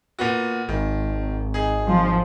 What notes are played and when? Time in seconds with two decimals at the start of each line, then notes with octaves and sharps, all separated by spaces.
0.19 A#2 B3 F#4
0.69 G#1 D#3
1.54 D#4 G#4
1.89 F3